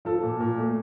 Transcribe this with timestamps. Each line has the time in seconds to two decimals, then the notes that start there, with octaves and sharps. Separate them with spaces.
0.05 F3 A4
0.23 A#2
0.40 A#2
0.57 A3